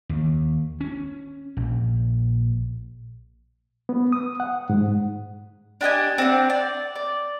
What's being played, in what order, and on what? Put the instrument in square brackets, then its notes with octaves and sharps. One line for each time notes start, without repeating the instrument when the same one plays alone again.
[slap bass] D#2
C#4
A#1
[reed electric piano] B3
D#6
F#5
G#2
[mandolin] D4 G4 D#5 G#5
C4 D4 F#5
D5
D5